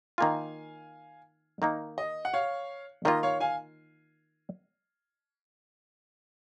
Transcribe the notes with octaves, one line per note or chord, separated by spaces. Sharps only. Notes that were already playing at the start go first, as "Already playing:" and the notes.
D#3 A#3 F4 F5 G#5
D#3 A#3 D#4
D#5
F#5
C#5 F5
D#3 A#3 F4 D#5
C#5 F5
F5 G#5